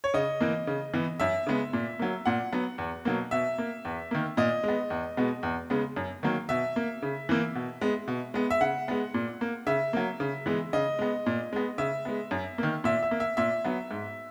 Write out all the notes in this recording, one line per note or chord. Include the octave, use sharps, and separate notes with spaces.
C#5
C#3 D#5
E3 A#3
C#3
E3 B3
F#2 E5
C#3 G#3 B3
A#2
F#3 A#3
A#2 F#5
F#3 B3
E2
B2 F#3 A#3
B2 E5
A#3
E2
D#3 A#3
A#2 D#5
G#3 B3
E2
B2 G#3 B3
E2
C#3 G#3 B3
F#2
D#3 F#3 A#3
B2 E5
A#3
C#3
E3 A#3
B2
G#3 B3
B2
G#3 B3
E5
C#3 F#5
G#3 B3
A#2
A#3
C#3 E5
F#3 A#3
C#3
E3 G#3 B3
C#3 D#5
G#3 B3
A#2
G#3 B3
C#3 E5
G#3 B3
F#2
D#3 A#3
A#2 E5
E5
A#3
E5
A#2 E5
F#3 B3
G#2